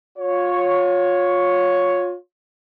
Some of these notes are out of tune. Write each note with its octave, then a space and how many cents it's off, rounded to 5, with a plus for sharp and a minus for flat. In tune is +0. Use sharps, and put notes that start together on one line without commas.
F4 +30 C#5 +0